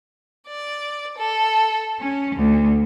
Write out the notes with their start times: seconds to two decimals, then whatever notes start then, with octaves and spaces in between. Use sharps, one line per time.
0.49 D5
1.18 A4
1.99 C#4
2.35 D2